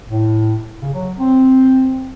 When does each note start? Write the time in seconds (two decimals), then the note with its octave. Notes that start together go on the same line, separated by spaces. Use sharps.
0.09 A2
0.82 C#3
0.94 F#3
1.20 C4